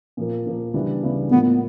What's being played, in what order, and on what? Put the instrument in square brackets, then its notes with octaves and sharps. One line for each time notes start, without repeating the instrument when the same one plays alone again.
[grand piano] A#2 F3 A#3
A#2 F3 A#3
C#3 E3 G3 B3 D4
C#3 E3 G3 B3 D4
[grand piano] A2 F3 A#3 [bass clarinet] B3